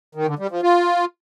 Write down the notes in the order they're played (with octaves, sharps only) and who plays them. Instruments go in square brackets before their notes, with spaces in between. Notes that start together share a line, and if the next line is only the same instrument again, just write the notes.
[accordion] D#3
D3
G3
F3
F4